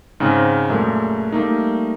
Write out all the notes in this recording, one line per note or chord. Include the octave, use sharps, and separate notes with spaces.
G#2 C#3 C4 D#4
F#2 A#2 G#3 A3
G3 A3 A#3 D#4